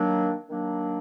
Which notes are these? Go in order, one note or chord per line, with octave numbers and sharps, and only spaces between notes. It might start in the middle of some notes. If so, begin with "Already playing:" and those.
Already playing: D#3 F#3 A#3 D4
D#3 F#3 A#3 D4